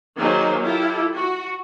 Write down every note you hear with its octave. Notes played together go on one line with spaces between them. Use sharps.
D#3 F#3 A#3 D#4 G#4 C5
E4 F4 G4 A4
F#4